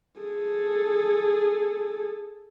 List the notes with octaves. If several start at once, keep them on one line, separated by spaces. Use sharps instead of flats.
G#4 A4